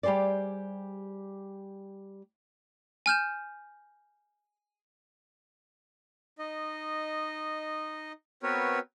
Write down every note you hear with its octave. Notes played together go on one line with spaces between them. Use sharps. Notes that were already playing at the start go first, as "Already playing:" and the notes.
G3 G4 G#4 C5 D5
G#5 F6 G6 E7
D#4 D#5
B3 C4 F#4 A#4 B4 C#5